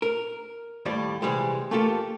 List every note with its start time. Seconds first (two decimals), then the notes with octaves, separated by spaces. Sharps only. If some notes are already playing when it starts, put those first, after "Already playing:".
0.02 A#4
0.85 D#2 A2 G3 D5
1.22 C3 E3 G3 G#3
1.71 A3 A#3 F4 G4 A4